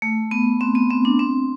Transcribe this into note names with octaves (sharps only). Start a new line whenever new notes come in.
A3
B3
C4
B3
C4
D4
C4